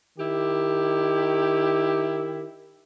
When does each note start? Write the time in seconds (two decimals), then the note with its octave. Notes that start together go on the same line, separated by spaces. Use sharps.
0.19 D#3 E4 G4